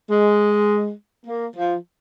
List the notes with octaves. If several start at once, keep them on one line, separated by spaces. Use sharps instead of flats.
G#3
A#3
F3